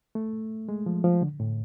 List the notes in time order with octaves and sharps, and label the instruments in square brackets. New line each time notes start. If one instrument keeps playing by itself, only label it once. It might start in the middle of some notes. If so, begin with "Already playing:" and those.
[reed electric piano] A3
G#3
F3
F3
D3
A2